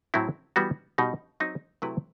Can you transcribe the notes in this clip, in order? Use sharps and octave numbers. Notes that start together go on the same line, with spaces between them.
A2 F#3 C4 E4
E3 G3 B3 F#4
B2 G3 D#4 G4
F#3 C4 D#4
C3 F#3 A3 E4 B4